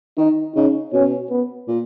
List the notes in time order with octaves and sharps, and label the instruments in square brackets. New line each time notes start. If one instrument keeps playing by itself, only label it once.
[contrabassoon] D#3 [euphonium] D#4
[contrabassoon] C#3 [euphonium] D#4
[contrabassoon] B2 [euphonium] C#4
[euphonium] B3
[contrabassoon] A#2